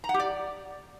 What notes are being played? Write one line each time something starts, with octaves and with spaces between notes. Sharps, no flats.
A#5
F#5
G4
D5